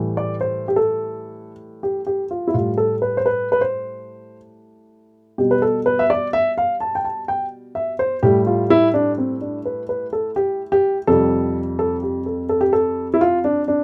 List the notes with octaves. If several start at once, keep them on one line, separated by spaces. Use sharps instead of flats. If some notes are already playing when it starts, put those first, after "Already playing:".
Already playing: A2 E3 G3
D5
C5
G4
A4
G4
G4
F4
E4
A2 G3 F4
A4
B4
C5
B4
B4
C5
B2 G3 G4
B4
A4
B4
E5
D5
E5
F5
A5
G5
A5
G5
E5
C5
A2 G3 G4
F4
E4
D4
C4
D4
B4
B4
A4
G4
G4
F2 C3 G3 A4
A4
G4
A4
A4
G4
A4
E4
F4
D4
D4